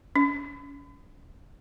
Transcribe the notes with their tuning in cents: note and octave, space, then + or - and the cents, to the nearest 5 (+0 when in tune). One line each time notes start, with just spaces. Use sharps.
C#4 +35